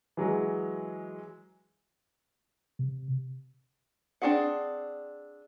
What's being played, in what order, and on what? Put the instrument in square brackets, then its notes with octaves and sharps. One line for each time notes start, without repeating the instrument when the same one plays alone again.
[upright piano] E3 F#3 G#3
[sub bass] C3
[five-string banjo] C4 D4 F#4 G#4 F#5